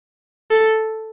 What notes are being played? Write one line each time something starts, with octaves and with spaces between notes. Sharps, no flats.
A4